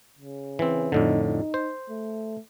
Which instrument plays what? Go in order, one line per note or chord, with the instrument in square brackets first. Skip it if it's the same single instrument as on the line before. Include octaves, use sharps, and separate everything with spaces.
[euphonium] C#3
[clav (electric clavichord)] E3 C4
[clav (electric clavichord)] F2 A2 D3 [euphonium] D#4
[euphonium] D#4
[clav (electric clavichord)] C5
[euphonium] A3